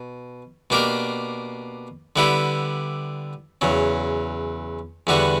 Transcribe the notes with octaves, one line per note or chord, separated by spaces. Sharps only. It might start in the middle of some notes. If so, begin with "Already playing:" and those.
Already playing: B2
B2 A#3 D4 G4 A#4
D3 G3 B3 E4 G4
E2 C#3 F#3
E2 D3 G3 B3 F#4